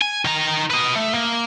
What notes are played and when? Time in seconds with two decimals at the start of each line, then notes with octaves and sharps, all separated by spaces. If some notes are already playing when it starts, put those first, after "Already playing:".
0.01 G#5
0.25 D#3 A#5
0.71 B4 D#5
0.95 A3
1.14 A#3